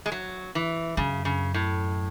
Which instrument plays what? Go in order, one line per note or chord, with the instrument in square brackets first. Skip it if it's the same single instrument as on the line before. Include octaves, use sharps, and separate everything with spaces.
[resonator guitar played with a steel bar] G#3
F#3
E3
[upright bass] F#2 [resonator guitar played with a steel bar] C#3
[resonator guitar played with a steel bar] C#3
A2